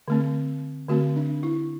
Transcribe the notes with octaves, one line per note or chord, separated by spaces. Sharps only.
D3 A3 C4
D3 A3 C4 F#4
D4
E4